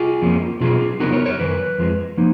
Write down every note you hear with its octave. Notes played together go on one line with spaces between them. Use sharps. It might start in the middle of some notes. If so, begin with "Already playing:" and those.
Already playing: F4 G#4
F2 F3 A#3 C#4
B2 F#3 C#4 F4 G#4
C#3 F#3 B3 D#4 F#4 A#4
A#4 C#5
A#4 C#5
F#2 D#3 F#3 B4
F2 F3 G#3
F3 A#3 D#4